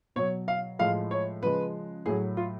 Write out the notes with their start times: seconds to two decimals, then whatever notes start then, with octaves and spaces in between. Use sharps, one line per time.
0.16 B2 F#3 C#5
0.48 F5
0.79 A2 F3 G#3 F5
1.11 C#5
1.42 C#3 F3 G#3 B4
2.06 A2 F#3 G#4
2.37 F4